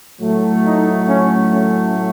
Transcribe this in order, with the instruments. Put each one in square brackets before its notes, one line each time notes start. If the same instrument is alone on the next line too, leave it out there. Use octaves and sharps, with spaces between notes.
[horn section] A2 F#3 A3
D#4
C#4
C#4